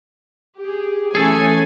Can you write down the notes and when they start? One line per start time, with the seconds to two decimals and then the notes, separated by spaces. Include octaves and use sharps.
0.58 G4 G#4
1.15 E3 A3 C#4 G#4 A4 G#5